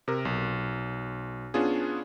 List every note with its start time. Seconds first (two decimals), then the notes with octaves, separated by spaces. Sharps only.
0.08 C3 A#4
0.25 B1
1.54 B3 C#4 D4 F4 G#4